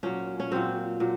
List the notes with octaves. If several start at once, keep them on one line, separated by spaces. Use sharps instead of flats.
A#2 F#3 C#4
C#4
A#2 F#3 C4
A#2 F#3